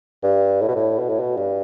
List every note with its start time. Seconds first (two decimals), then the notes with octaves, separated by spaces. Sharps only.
0.23 G2
0.61 A2
0.68 B2
0.75 A2
0.99 B2
1.09 A2
1.20 B2
1.37 G2